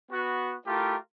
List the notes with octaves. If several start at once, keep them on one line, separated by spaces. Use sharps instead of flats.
B3 F#4
A3 E4 F4 G4 A#4